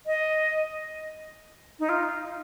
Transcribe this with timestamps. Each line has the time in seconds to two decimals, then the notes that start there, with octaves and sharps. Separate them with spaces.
0.06 D#5
1.79 D#4
1.89 F4